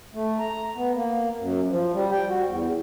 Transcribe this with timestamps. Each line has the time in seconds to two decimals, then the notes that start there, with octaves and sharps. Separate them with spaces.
0.14 A3
0.39 A#5
0.76 B3
0.94 A#3
1.40 F#2
1.70 F3
1.93 G3
2.12 G5
2.29 F#4
2.47 E2